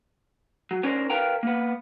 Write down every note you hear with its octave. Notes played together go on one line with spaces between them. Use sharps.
F#3
B3 C#4 D4 A#4 C5
A#4 B4 F5 G5 A#5
A#3 B3